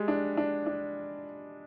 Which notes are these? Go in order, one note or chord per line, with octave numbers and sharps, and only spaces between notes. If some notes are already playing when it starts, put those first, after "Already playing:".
Already playing: G3 G#3
D4
D4
D4